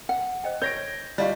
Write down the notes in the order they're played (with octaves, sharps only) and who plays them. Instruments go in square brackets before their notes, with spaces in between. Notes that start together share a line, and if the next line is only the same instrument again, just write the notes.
[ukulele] F#5
[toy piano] C5 D#5 G5
[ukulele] C#5 [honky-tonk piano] G6 A#6 D7
[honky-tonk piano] G3 F4 [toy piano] D#4 D#5 C#6